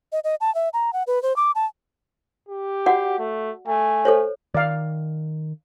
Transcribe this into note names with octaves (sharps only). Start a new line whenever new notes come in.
D#5
D#5
A5
E5
A#5
F#5
B4
C5
D6
A5
G4
F#4 D5 F#5
A3
A3 G#5
A4 C5 C#5
D#3 D5 F5